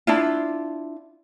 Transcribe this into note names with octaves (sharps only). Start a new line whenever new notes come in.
D4 E4 F4